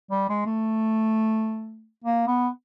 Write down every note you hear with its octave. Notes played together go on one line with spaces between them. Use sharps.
G3
G#3
A3
A#3
B3